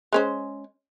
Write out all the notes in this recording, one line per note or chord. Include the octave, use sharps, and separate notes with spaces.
G#3 C#4 C5